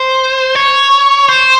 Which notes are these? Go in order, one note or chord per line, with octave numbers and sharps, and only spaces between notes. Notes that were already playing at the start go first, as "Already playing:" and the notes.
Already playing: C5
C#5
C5